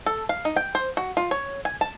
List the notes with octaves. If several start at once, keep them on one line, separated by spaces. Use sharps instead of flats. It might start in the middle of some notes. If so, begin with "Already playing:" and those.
A4
F5
D#4
G5
C5
F#4
F4
C#5
G#5
A5